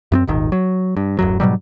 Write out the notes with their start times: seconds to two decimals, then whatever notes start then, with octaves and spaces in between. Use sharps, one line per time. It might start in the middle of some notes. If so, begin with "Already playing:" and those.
0.12 F#2 B3 C4
0.27 D#1 G#1 D#3
0.52 F#3
0.97 G2
1.19 D1 F#2 F#3
1.40 G#2 B2 F#3 G3